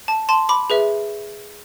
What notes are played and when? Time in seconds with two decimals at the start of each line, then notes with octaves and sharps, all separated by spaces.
0.08 A5
0.29 A5 C6
0.49 B5 D6
0.70 G#4 B4 E5